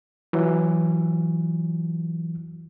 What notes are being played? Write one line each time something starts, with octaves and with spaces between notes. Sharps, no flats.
E3 F#3